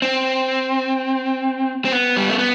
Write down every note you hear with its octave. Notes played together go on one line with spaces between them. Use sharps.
C4
C4
B3
G3
A3
B3